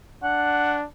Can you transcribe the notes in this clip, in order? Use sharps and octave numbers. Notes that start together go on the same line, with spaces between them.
D4 F#5